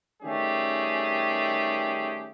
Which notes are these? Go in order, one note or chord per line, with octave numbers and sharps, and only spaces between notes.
D#3 G3 A3 C#4 G4 G#4